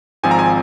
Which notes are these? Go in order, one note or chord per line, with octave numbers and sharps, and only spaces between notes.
G#1 G#2 F3 C4 G#5
A#5
G#5